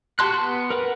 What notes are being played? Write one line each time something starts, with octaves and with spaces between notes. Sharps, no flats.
F#4 G4 A5 C6 F#6
B3
A#4 B4 F#5